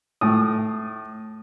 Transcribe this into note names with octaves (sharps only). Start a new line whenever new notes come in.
A2 D#6